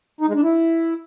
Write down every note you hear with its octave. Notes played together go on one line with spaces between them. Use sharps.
D#4
G#3
D4
E4